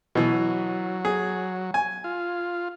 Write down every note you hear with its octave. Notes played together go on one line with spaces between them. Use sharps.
B2 E3 F#3
G#4
G#5
F4